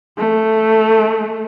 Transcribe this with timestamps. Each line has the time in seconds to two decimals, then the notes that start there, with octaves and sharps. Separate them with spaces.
0.18 A3